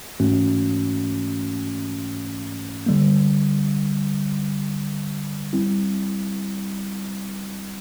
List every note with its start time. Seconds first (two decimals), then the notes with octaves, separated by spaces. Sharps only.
0.20 G#2 E3 A3 C#4 F#4
2.86 D3 G3 A#3
5.53 G3 C4 E4